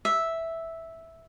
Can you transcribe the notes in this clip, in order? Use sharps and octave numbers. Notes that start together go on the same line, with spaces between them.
E5